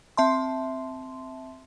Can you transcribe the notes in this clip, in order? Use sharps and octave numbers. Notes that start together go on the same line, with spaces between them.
C4 E5 A5 C6